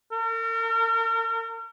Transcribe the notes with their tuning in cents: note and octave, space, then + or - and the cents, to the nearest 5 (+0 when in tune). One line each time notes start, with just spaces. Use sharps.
A#4 -40